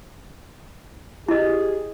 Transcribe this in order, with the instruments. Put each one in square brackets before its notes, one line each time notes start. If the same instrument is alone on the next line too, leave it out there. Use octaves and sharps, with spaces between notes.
[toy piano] E4 D#5 [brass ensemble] G4 G#4